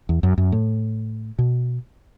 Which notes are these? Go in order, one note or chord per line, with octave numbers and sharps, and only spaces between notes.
E2
F#2
F#2
A2
B2